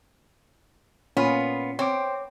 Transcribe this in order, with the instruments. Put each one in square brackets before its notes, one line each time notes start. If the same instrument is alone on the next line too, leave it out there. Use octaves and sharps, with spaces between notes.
[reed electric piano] A#2 C#4 [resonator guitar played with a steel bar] B3 F4
[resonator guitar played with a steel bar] C4 [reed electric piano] C#5 D6